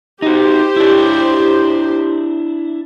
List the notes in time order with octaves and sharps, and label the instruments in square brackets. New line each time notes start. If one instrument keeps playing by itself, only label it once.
[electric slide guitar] D#4 F#4 [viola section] G4 C5
[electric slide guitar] D4 E4